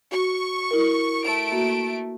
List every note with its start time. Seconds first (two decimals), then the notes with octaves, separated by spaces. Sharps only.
0.12 F#4 C#6
0.71 E4 A#4
1.23 A3 D7
1.52 A#3 F#4